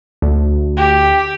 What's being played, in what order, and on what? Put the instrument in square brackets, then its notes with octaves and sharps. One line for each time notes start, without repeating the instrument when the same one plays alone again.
[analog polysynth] D2
[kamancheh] G4